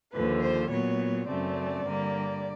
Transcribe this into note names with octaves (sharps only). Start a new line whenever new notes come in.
D#2 D3 F3 B4
C5
A#2 F#3 B3 C#5
F#2 C#3 F#3 A3 C4 D5
G2 D3 G3 A#3